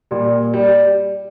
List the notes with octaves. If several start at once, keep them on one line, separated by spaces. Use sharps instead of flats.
A#2 G3
G3